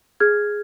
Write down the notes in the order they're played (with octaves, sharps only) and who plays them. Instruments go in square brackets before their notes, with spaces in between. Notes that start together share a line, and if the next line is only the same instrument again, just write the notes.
[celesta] G#4 F6 G#6